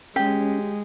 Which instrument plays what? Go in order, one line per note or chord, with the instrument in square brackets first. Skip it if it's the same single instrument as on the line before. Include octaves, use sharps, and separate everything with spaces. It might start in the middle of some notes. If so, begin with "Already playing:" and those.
[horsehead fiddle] G#3 [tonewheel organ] C#4 [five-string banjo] G4